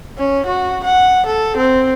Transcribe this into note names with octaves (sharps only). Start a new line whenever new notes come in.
C#4
F#4
F#5
A4
C4